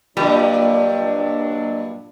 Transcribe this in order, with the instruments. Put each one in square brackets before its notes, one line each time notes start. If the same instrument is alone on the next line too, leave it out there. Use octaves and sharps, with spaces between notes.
[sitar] G2 A#2 [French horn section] F#3 D4 [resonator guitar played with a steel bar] G3 [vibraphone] A#3 D#5 E6